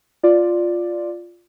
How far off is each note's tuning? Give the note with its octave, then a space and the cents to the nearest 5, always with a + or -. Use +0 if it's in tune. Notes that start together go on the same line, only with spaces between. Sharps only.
F4 +0 D5 +0